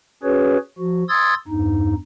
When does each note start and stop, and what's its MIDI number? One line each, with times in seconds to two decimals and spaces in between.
0.23 0.57 61
0.23 0.57 66
0.23 0.57 68
0.23 0.57 71
0.23 0.57 73
0.78 1.03 53
0.78 1.03 66
1.09 1.34 84
1.09 1.34 87
1.09 1.34 88
1.09 1.34 92
1.09 1.34 93
1.48 1.94 40
1.48 1.94 43
1.48 1.94 63